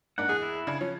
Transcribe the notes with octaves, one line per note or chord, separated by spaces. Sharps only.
G#2 A#3 D4 F#5
E2 G#4
E4
C#3 D4 G#6
F3 C#4